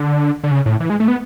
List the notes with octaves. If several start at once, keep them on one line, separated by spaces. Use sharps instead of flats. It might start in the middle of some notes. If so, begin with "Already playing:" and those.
Already playing: D3
D3
C#3
A2
E3
G#3
A3
B3